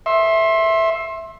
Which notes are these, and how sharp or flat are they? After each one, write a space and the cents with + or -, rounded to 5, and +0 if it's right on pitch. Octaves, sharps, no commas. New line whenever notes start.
E5 +0 C6 +30